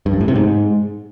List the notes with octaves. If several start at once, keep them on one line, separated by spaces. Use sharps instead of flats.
G2
F#2
A2
C3
G#2